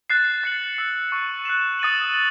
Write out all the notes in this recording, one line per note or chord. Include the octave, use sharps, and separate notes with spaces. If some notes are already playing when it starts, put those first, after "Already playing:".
F#6 A6 C7 E7
F#6 A6 C#7 F#7
E6 C7 F#7
C#6 E6 A6 D#7
F#6 C7 E7
D#6 A6 D#7 F#7
F#7